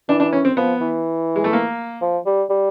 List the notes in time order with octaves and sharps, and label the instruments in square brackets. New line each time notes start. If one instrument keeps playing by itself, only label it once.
[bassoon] E3 [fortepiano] D4
[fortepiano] D4
C#4
C4
[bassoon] F3 [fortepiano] B3
[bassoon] E3
[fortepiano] G#3
A3
A#3
[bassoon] F3
G3
G3